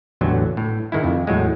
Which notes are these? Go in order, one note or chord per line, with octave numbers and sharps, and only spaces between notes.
A1 E2 D3 F#3
A2
G#2 D#3 G#3 E4
F2
E2 A2 F#3 G#3